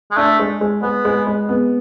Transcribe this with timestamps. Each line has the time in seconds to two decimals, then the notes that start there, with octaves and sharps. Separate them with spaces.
0.11 G#3
0.17 A3 D4
0.40 G#3
0.61 G#3
0.82 G#3 B3
1.05 G#3
1.27 G#3
1.49 B3